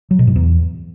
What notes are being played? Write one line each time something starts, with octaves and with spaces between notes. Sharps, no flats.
F#3
B2
G#2
E2